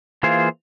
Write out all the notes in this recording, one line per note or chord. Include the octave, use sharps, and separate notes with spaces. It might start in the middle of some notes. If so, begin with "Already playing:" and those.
E3 A#3 F4 G#4 C5